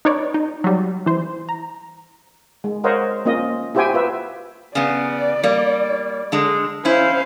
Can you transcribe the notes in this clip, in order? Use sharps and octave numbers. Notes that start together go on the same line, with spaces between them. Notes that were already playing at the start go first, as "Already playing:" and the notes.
D#4 B4 C#5 D5
D#4
F#3 G3
E3 C5
A#5
G#3
A#4 C5 C#5 D#5 F5 F#5
A#3 C#4 F4 D#5
E4 F#4 G4 C5 G5 G#5
F4 B4 E5
C#3 B3 D5
G3 A#3
D3 G#3
C#4 E4 C5 F5